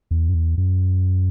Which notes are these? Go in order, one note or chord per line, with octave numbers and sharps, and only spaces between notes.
E2
F#2
E2
F#2